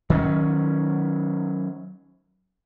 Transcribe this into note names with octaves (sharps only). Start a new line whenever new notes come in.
D#3 F#3 C#4